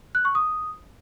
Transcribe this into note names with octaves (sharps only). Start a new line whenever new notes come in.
F#6
C#6
D#6